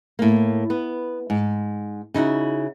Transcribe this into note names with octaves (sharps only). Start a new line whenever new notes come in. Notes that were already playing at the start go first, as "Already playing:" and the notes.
A2 A#3
B3
G#2
C#3 D#4 E4 F#4